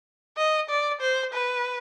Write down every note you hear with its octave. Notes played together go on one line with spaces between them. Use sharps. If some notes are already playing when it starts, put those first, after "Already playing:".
D#5
D5
C5
B4